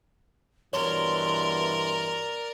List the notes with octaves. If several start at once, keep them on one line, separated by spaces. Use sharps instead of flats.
G2 B2 E3 A#4 C#5 D5 C6